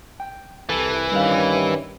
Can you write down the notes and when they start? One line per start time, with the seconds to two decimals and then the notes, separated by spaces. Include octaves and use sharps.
0.20 G5
0.69 C2 E3 A4
1.12 G2 D#3 G3 C#4 G4 F5